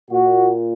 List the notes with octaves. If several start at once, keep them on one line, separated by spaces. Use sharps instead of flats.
A#2 F#4